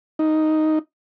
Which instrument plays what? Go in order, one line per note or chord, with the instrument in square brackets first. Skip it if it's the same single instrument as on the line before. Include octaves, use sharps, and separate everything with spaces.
[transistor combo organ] D#4